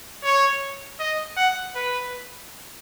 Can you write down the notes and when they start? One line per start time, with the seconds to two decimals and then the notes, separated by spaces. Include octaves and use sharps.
0.23 C#5
1.00 D#5
1.37 F#5
1.76 B4